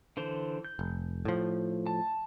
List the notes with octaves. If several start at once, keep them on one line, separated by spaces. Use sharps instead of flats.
D3 E3 C5
G6
F1
A2 F3
A5